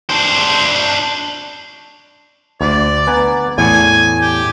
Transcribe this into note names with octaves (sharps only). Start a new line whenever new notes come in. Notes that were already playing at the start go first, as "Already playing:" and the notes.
D4 C5
D2 D5
B3 G#5 A#5
E2 A2 G#5
G4